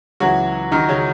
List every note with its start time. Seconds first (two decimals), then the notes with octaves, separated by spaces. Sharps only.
0.20 C#2 C#3 E3 F#3 F#4
0.71 D#3 D#4
0.89 C#3 C#4